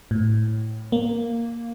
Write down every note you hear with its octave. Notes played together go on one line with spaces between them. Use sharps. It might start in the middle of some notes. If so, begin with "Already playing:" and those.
A2
A#3